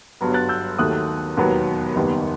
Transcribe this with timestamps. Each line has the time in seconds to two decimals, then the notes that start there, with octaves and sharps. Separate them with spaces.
0.21 G1 G2 F#3 B3
0.34 F#6 A6
0.49 E6 G6
0.78 D#2 D#3 F#3 A3 D#6 F#6
1.37 E1 D#2 D#3 F#3 B3
1.96 F#1 E2 D#3 G3 B3